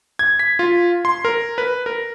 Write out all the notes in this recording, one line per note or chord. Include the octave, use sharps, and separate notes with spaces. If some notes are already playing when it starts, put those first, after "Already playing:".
G#6
B6
F4
C6
A#4
B4
A#4